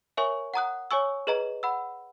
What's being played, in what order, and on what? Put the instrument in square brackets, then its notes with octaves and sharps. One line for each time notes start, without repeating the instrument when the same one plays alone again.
[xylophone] A#4 C#5 E5 G#5 C#6
F#5 A#5 D#6 F#6
C#5 G#5 C#6 E6
G#4 B4 D#5 A#5
F#5 B5 E6